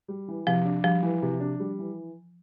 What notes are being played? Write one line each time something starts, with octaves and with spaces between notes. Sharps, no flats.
G3
E3
C3 F3
D4
F3 G3
E3
C3
D4
G3
E3